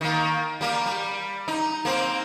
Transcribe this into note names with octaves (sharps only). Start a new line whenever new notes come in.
D#3 A#3
G3 A#3
G3
D#4
A#3 C4